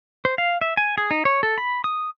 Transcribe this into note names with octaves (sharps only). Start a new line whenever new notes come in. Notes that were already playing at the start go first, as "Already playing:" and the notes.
C5
F5
E5
G#5
G#4
D#4
C#5
A4
B5
D#6